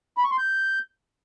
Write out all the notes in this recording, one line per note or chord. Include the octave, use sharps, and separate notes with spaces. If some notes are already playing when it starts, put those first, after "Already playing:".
B5
C#6
C6
G6